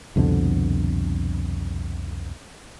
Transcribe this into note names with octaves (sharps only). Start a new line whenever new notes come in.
C2 F2 B2 D3